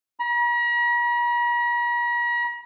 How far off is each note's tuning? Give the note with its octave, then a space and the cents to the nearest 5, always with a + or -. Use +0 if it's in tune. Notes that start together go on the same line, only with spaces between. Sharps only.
A#5 +45